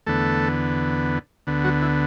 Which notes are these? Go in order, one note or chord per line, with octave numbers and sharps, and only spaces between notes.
E2 D3 A3 B3 A4
D2 D3 B3
F#3 F#4
E4